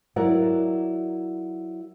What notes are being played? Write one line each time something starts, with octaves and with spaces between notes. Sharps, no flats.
F#3 E4 A#4 D5 F#5